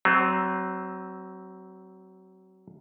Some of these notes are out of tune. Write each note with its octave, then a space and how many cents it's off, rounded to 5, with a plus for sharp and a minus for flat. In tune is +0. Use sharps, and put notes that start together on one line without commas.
F#3 +25 C4 +0